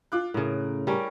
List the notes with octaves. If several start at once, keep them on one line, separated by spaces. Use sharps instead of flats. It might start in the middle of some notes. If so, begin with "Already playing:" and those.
F4 D6 F#6
A2 C#3 A#4
G3 C#4 A#4